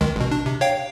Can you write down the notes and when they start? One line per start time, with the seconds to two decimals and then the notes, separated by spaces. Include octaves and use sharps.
0.01 C#2 D#3 G#3
0.16 A1 B2
0.32 D4
0.46 C3
0.61 C#5 F5 G5